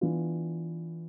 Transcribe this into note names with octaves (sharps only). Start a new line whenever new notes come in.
E3 B3 D4 F4